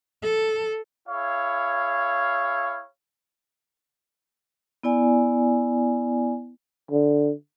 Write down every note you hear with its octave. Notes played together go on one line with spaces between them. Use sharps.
A4
E4 G#4 C#5 F5
B3 E4 D5 G#5
D3